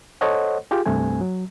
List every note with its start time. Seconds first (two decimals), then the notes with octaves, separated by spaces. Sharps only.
0.21 A4 C5 C#5 D#5 F#5
0.71 F4 G4 G#4
0.86 C2 G2 A3 C4 G#5
1.21 F#3